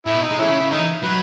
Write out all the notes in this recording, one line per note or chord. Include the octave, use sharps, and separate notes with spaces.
A2 E4
B2
D#4
G#3
E3 A3 C#4 E4
C#3
C#3
D#3 D#4
E3
F#3 B4